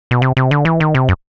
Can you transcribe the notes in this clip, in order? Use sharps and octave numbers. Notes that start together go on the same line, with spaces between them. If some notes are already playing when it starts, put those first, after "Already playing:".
B2
C3
C3
D3
E3
D#3
C3
F#2